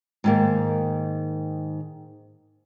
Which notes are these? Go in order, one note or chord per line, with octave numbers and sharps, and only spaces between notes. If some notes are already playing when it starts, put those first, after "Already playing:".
G#2 D#3 A#3